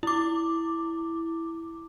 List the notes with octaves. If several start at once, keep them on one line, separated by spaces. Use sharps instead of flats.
E4 D6